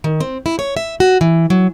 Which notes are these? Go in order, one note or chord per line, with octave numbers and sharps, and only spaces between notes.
D#3
C4
E4
C#5
E5
F#4
E3
F#3